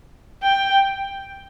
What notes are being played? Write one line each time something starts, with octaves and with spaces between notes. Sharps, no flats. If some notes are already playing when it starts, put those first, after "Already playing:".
G5